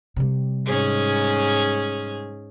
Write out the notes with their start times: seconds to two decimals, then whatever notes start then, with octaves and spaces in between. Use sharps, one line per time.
0.16 C3 G3
0.66 G#2 C#4 G#4